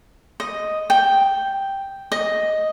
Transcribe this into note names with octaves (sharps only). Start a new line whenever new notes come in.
D#5
G5
D#5